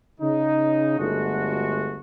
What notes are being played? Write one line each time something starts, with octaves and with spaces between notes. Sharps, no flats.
C#3 D#4
G1 G#3 A3 D4 F#4